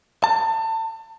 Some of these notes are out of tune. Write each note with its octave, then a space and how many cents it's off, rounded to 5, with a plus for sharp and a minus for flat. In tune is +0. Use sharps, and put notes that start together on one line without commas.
A5 +30